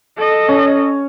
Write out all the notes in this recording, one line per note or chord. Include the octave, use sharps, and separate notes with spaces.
A4 D#5
C#4